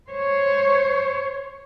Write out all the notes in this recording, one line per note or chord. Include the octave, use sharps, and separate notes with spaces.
C5 C#5